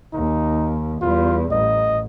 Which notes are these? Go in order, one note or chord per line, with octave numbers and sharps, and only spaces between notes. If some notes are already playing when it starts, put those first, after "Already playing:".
D#2 D#4
E2 G3 F4
A1 D#5